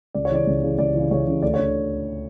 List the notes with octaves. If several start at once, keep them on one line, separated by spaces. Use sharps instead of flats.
C#2 D5
C#5
C#3 E3 D5
C#2
C#3 E3
C#2 D5
C#3 E3
C#2 C#5
C#3 E3
D2 D5
C#5
D3